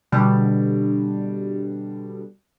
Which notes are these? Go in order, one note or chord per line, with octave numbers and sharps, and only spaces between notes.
B2 D3 G3 D4